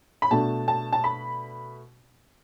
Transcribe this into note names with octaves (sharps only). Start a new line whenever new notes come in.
B5
B2 A3 D4 A5
A5
A5
B5